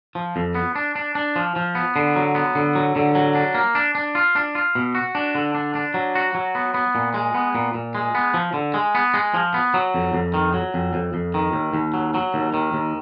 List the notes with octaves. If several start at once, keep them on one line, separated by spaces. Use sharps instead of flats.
F3
F2
B3
D4
D4
D4
F3
F3
B3
D3
F#3
B3
D3
F#3
D3
F#3
D4
A#3
D4
D4
F4
D4
F4
B2
F#4
D4
D3
D4
D4
F#3
F#4
F#3
B3
B3
A#2
G#3
B3
A#2
A#2
G#3
B3
F3
D3
G#3
B3
G#3
F3
B3
F#3
F2
F2
D#3
F#3
F2
F2
F2
D#3
D#2
D#2
F#3
F#3
D#2
D#3
D#2